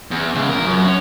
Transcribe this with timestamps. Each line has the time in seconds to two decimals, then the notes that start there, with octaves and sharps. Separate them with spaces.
0.11 E2
0.35 C#3 G#3
0.49 F3 A#4
0.65 F#2
0.86 C#4